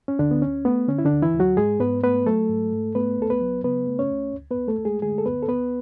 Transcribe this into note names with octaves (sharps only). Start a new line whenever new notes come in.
C#4
D2 D3 D4
B3
D2 C#4
A3 B3
D3 C#4
E4
D3 D4
D2
E3 E4
D2
F#3 F#4
G#2 G#3 G#4
G#2 B3 B4
A3 B3 B4
F#3 A3 A4
G#2
G#2
A3 B3 B4
C#2 A4
B3 B4
F#3
C#3 B3 B4
A3
C#4 C#5
C#2
D2
B3 B4
D2
A3 A4
A3
G#3 G#4
D3 G#3 G#4
A4
D2 B3 B4
A4
D2 B3 B4